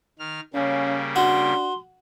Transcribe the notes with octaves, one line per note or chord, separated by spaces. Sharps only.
D#3 F6
C#3 G3 A#3 C#4 F5
D4 F#4 C6